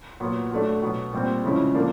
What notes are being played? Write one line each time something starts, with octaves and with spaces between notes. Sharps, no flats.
A#2 F#3 B3
F#3 A3 D4
B2 F#3 B3
A#2 G3 C4
C#3 F3 G#3 C#4 E4
D3 F3 A#3 D4